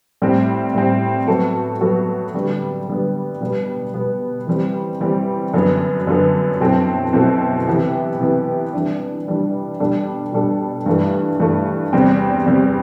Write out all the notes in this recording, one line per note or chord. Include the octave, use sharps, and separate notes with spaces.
A2 G3 C4
A2 G3 C4
F#3 B3 F#4 A4
F#3 B3 F#4 A4
D3 G3 B3
D3 G3 B3
B2 G3 B3
B2 G3 B3
E3 G3 C4
E3 G3 C4
F#2 D3 F#3 B3
F#2 D3 F#3 B3
B2 F#3 C4 E4 A4
B2 F#3 C4 E4 A4
C3 E3 B3 E4 G4
C3 E3 B3 E4 G4
E3 G3 D4
E3 G3 D4
B2 G3 D4 A4
B2 G3 D4 A4
G2 E3 A3
G2 E3 A3
E2 C3 G3 C4
E2 C3 G3 C4